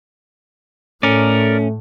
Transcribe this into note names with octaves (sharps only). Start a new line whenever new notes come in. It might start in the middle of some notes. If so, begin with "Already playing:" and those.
A2 A3 C#4 A#4 D5